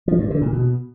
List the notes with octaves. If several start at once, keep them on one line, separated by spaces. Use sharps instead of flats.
F3
G2
D3
A#2
B2